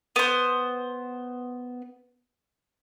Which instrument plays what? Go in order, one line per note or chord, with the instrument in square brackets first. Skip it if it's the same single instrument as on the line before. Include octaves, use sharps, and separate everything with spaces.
[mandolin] B3 C5